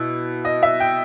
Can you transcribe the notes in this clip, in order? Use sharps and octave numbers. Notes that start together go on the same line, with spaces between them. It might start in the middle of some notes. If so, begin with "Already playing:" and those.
Already playing: B2 E4
D#5
E5
G5